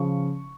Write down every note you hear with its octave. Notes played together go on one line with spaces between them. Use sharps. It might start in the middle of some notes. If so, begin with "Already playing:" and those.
Already playing: C#3 F3 C#6